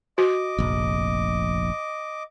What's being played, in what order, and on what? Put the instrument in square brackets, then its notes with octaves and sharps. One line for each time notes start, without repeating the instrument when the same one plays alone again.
[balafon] F#4 [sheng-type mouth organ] D#5 D6
[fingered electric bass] F1 A#1